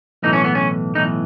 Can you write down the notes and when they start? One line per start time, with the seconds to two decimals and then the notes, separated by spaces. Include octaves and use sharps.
0.23 B1 A2 E3 D#4
0.33 C#4
0.44 B3
0.55 C#4
0.95 B1 A2 E3 D#4